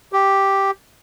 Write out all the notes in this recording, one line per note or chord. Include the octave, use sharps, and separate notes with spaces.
G4